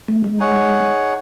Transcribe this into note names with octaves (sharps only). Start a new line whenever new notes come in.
A3
G#3
D#4 G#4 C#5 F#5